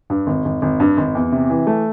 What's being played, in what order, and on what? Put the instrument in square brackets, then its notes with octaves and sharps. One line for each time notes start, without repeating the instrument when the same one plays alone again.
[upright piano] G2
G#1
G#1
G#1
G2
G#1
E2
C3
E3
A3